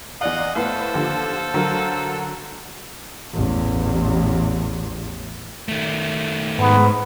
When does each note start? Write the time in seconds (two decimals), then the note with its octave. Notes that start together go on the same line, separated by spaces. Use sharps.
0.21 E2 D5 D#5 F5 F#5
0.55 A2 B3 A4 C5 F5
0.94 D#2 D3 F3
1.54 D3 F#3 A#4
3.34 A1 E2
5.69 D#3 A3
6.59 G#2 B3